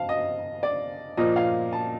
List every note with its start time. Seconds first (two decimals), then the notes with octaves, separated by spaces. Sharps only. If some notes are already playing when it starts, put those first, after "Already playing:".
Already playing: F5 A5
0.09 D#5
0.63 D5
1.17 A#2 F3 A#3 D#5
1.36 F5
1.73 A5